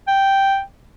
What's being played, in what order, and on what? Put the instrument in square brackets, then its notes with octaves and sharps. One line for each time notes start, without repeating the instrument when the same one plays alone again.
[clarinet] G5